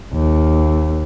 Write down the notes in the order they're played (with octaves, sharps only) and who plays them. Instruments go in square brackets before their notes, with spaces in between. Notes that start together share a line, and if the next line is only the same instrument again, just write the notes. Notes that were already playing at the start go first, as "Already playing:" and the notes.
[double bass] D#2